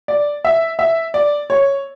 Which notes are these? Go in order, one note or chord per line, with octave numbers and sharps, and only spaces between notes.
D5
E5
E5
D5
C#5